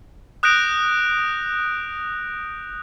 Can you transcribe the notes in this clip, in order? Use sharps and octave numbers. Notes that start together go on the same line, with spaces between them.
D#6 F#6 G6 A#6 D7 F7